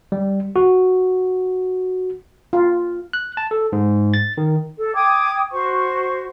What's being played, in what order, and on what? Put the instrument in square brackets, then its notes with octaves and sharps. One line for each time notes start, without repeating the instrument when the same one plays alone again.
[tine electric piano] G3
F#4
[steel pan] F4
[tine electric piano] F#6
A5
A4
G#2
A6
D#3
[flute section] A4
G5 D6 D#6 G#6
F#4 C5 C#6